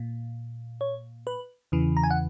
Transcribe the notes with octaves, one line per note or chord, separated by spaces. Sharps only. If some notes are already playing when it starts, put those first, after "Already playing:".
Already playing: A#2
C#5
B4
E2 C#3 E3
A#5
G#5
F#5